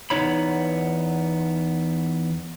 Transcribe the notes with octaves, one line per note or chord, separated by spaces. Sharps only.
E2 F3 B3 D#4 C#5 B5